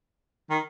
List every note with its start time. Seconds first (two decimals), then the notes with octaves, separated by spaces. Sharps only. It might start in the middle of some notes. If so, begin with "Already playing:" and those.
0.50 D#3